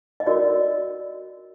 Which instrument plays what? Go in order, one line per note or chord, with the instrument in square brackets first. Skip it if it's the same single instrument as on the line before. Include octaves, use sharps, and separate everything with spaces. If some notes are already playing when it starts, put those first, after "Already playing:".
[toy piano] D#5
F#4 A#4 D5